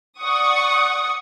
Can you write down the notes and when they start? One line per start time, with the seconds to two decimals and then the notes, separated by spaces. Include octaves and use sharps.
0.20 D5 F#5 C#6 D#6